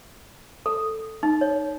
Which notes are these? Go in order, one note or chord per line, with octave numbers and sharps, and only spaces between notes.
A4
D#4
C#5